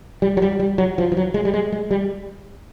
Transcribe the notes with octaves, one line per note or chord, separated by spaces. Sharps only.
G3
F#3
G3
G3
F#3
F3
F3
F#3
G#3
G3
G#3
G#3
G3